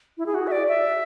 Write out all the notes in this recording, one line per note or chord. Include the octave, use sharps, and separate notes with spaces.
E4
G#4
F#4
E5
D5
E5